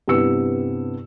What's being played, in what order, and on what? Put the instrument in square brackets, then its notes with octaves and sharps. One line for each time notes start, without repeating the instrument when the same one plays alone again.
[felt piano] G2 C3 B3 E4 E6 C#7